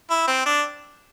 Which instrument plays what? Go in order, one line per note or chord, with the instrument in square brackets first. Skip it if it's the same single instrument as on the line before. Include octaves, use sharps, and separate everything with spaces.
[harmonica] E4
C4
D4